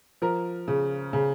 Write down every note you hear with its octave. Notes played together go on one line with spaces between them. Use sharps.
F3 A#4
C#3
C#3